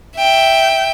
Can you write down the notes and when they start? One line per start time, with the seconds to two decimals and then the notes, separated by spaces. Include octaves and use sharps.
0.18 E5 G5